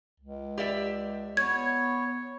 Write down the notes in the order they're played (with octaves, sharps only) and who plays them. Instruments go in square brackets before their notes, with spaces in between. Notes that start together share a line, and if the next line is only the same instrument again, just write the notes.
[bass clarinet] C#2
[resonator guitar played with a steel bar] G4 D5 E5
[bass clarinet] B3 [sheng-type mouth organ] C#5 [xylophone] G#6